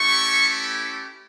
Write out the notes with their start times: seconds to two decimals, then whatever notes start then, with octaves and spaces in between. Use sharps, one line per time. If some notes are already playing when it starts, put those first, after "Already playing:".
Already playing: A3 C#4 E4 G4 C#6